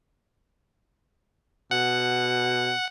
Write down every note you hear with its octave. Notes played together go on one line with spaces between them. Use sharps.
B2 F#5